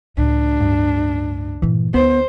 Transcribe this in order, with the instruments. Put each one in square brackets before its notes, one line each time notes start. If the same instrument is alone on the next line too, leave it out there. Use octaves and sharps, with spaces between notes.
[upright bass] C#2 A2 [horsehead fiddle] D4
[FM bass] G2
[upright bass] G1 A#2 [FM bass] E3
[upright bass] D2 [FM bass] B3 [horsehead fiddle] C5